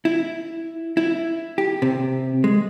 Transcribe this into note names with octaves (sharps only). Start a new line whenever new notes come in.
E4
E4
G4
C3
G#3